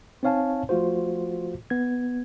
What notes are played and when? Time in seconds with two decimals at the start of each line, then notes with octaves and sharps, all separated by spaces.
0.23 C4 D#4 C#5 F5 G#5 A5
0.69 F3 A3 F4 F#4 C5
1.70 B3 G#6